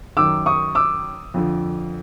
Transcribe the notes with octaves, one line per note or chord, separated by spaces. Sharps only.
F#2 D#3 D6 E6
C#6 D#6
D6 E6
F2 D3 F3